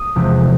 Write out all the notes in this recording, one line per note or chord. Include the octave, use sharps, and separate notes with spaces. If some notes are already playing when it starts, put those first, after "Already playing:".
Already playing: D#6
E2 C3 F3 G#3